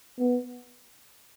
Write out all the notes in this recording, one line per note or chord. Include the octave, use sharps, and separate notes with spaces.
B3